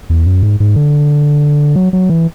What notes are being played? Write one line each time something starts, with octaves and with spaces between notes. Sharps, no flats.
E2
F#2
G#2
G#2
D3
F#3
F#3
E3